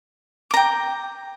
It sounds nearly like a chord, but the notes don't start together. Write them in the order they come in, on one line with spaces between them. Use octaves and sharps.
D6 A#5 G5